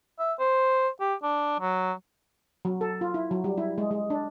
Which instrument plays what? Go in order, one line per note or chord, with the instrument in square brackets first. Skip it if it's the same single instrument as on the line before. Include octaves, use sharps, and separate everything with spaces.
[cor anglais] E5
C5
G4
D4
F#3
[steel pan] F#3
A4
F4
E4
F#3
G3
E4
G#3
G#3
D4